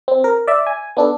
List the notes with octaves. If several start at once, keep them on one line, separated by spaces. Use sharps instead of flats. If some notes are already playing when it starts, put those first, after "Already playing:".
C4
A#4
D5 E5
G#5
B3 D4 A4